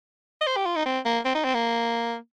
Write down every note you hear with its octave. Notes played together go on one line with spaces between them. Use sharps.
D#5
C5
G4
F4
D#4
C4
A#3
C4
D#4
C4
A#3